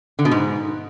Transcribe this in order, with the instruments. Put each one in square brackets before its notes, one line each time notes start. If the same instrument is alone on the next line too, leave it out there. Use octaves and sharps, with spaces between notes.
[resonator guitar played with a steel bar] D3
B2
G#2